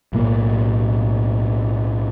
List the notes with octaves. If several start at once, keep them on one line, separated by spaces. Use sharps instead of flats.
B1 A2 A#3